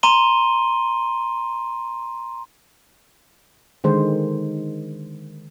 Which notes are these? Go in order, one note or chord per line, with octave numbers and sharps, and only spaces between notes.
A#5 C6 D#7 G7
D3 D#3 G#3 C5